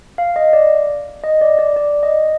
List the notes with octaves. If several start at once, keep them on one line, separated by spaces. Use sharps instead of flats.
F5
D#5
D5
D#5
D5
D5
D5
D#5